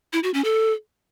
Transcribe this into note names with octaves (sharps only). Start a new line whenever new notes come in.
E4
F#4
C#4
A4